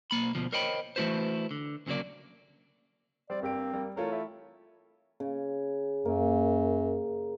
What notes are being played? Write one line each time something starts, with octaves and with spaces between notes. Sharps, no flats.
B1 A#3 B5
D2 B2 D3 F3
A#4 C5 C#5 D#5 G5 B5
E3 A3 E4 F#4 B4 C5
D3
D2 C#3 F#3 A#3 D5
G3 C4 D5
G1 A#3 C4 G4 D7
G3 A#3
E3 A3 F4 A#4 C#5
E4
C#3
F#2 A#3